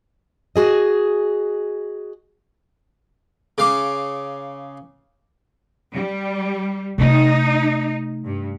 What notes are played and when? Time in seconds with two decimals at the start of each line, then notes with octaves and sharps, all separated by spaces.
0.56 F#4 G#4 D#5
3.58 C#3 F5 D6
5.94 G3
6.98 C3 A3 D#4
8.25 G2